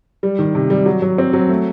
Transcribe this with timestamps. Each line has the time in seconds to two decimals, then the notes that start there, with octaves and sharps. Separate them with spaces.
0.23 G3
0.39 D#3
0.55 C3
0.70 G3
0.86 F#3
1.02 F#3
1.18 C4
1.33 F#3
1.49 A3